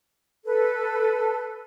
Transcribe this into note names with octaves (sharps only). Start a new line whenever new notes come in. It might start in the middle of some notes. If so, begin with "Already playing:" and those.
A4 B4